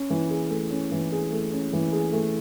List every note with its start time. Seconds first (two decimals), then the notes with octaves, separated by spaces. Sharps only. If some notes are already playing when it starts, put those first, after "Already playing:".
Already playing: C#4
0.10 E3
0.30 G#4
0.50 A3
0.70 C#4
0.92 E3
1.12 G#4
1.32 A3
1.52 C#4
1.73 E3
1.92 G#4
2.13 A3